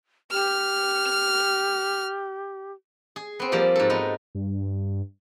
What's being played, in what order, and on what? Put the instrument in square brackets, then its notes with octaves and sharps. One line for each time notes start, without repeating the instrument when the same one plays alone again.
[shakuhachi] G4 [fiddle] F6
[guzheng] G#4
B3 C4
F3 G3 A#3 G4
G#2 A4
B3 D#4
[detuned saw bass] G2